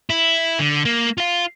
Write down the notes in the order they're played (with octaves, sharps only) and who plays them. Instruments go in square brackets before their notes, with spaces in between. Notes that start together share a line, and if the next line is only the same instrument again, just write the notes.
[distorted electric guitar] E4
D3
A#3
F4 F5